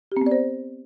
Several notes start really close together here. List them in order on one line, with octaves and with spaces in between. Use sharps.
G4 C4 B3 D5 C5